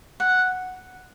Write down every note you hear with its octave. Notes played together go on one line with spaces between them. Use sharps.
F#5